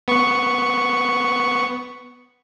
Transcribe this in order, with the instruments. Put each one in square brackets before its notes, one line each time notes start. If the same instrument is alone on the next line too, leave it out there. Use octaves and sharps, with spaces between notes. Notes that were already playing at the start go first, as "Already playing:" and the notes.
[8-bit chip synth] B3 C#6